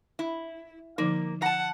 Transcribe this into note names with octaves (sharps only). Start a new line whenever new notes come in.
E4
D3 F3 A#3 D#4
F#5 A5 A#5